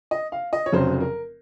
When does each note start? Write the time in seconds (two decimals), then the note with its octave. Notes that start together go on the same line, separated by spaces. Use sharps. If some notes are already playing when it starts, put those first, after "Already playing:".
0.11 D#5
0.32 F5
0.53 D#5
0.66 C#5
0.72 F1 F2 C#3 F#3 C5
1.00 A#4